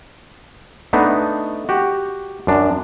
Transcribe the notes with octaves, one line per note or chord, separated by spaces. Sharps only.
A3 B3 D4 D#4
F#4 G4
F#2 D4